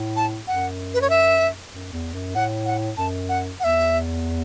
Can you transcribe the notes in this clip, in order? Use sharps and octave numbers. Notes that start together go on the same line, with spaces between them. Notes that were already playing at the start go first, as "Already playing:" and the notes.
Already playing: A2
A5
F#2 F#5
B4
C#5
E5
F#2
E2
F#2
A2 F#5
F#5
F#2 A5
F#5
E2 E5 F#5